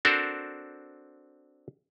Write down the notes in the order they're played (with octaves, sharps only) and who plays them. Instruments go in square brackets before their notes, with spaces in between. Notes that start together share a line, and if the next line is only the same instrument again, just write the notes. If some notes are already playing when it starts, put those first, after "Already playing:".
[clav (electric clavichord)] C4 D4 F#4 A4 A#4 C5